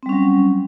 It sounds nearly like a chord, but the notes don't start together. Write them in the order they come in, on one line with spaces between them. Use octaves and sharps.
C4 G3 C#4 F#3